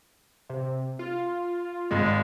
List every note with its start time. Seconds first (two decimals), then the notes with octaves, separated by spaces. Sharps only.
0.50 C3
0.99 F4
1.91 G#1 G#3 F4